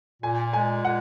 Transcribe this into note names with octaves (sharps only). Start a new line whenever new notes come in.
A#2 G#5
G#3 G#5
A#2 F#5